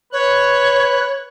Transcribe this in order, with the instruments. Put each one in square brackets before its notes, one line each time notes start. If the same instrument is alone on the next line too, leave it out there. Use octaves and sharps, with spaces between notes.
[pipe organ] B4 F#6 [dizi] C#5